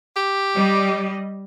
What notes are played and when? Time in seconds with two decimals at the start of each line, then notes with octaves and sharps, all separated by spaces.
0.16 G4
0.55 G3 D#5